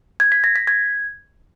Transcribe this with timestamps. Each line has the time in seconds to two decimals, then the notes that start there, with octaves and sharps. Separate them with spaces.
0.20 G#6
0.32 B6
0.44 A#6
0.56 B6
0.67 G#6